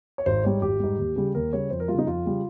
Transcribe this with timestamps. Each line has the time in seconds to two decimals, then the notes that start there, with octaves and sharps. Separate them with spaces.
0.18 C#5
0.26 G#1 C5
0.44 G#2 G3 C#5
0.62 G#1 G4
0.80 G#2 G3
0.98 D#2
1.16 C#3 G3
1.35 D#2 A#4
1.53 C#3 G3 C#5
1.70 F2 C5
1.80 A#4
1.88 C#3 G3 F4
1.99 D#4
2.07 F2 F4
2.25 C#3 G3